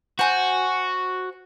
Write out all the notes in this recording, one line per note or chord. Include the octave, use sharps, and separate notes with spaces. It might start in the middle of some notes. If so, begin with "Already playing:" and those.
F#4 C5 G#5 G6